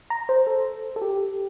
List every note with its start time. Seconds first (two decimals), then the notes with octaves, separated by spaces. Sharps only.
0.10 A#5
0.29 C5
0.47 A4
0.96 A4
1.02 G4